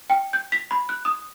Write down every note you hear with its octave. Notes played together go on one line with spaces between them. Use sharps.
G5
G6
B6
B5
F#6
D#6